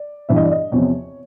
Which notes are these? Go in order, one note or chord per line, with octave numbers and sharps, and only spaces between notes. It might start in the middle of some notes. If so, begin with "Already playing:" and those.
Already playing: D5
G2 E3 E5
D#5
D5
D#5
E2 C3 F3 C#5